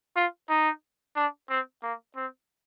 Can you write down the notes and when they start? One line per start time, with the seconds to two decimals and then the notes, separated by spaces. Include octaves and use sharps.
0.16 F4
0.50 D#4
1.16 D4
1.50 C4
1.83 A#3
2.16 C4